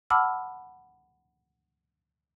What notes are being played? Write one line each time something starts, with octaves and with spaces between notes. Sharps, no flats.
F#5 A5 B5 D6 E6 F6